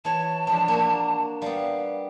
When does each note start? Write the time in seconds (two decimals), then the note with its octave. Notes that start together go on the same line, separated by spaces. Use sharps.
0.05 E3 C#5 A5
0.47 F3 G#3 D4
0.68 A#3 F#4
1.42 G3 B3 F5